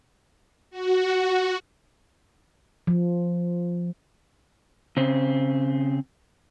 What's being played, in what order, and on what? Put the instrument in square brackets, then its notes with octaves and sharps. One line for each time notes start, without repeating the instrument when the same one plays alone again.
[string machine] F#4
[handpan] F3
[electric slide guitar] C#3 C4